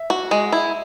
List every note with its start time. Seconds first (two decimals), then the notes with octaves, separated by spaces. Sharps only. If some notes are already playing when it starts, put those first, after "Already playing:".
Already playing: E5
0.10 F#4
0.31 G#3
0.52 E4